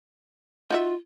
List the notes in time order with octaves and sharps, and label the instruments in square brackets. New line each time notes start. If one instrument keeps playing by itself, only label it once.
[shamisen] D#4 F#4 E5 [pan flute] F4